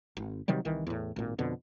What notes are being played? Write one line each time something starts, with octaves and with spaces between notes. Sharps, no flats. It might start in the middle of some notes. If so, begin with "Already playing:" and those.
G#1
C3 D#3 F#3 G3
C2 D#3 E3
E2 A2
G#1 A#2
F2 B2 D3